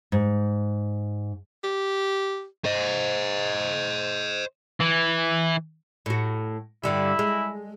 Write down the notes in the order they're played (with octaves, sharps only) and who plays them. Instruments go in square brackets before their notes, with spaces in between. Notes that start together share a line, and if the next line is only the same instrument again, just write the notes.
[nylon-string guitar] G#2
[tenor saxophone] G4
[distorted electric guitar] C5 D#5
E3
[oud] A2 F#4
[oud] G2 D3 G3 [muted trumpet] E4
[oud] G#3